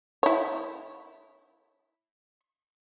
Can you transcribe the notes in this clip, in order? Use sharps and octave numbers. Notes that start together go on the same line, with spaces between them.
E4 C#5